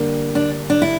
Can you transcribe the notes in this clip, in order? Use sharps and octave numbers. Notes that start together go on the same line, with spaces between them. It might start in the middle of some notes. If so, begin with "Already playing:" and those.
Already playing: D3 G3 A#3
D4
D4
E4